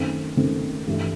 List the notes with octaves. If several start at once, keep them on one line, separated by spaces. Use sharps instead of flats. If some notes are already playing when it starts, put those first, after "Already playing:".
Already playing: F#2 D#3 A3 C4
F#2 D#3 A3 C4
G2 E3 A3